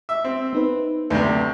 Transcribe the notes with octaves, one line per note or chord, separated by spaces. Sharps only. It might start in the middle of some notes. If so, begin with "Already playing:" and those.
E5
C4
B3 D#4 B4
D2 C3 B4